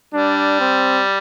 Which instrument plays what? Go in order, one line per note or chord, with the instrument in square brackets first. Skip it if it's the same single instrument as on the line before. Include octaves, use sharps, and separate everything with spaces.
[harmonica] G3 [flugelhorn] D4
[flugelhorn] C4